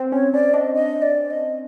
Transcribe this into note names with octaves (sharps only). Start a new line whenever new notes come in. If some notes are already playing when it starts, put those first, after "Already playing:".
Already playing: C4
C#4 C#5
C#4 D5
D4 D#5
D#5
D5
D#5